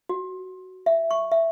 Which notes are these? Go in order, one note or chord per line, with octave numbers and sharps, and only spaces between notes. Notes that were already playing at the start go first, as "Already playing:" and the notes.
F#4
E5
C#6
E5